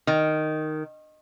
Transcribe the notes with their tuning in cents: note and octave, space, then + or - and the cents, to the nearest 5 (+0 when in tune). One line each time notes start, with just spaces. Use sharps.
D#3 -5